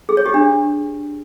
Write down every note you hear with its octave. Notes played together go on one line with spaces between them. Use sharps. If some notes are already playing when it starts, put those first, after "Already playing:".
G#4
C#5
G4
D4